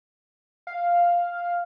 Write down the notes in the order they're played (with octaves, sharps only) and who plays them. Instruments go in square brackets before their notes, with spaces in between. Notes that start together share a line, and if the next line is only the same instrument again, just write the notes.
[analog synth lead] F5